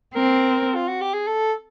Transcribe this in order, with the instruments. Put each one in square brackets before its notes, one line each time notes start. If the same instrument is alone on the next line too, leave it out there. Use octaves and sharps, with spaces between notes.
[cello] C4 [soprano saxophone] A#4
[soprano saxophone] F4
F#4
G4
G#4
A4